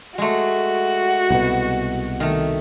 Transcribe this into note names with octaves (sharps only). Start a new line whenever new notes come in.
G#3 A3 F#4
C2 B2
D#3 A3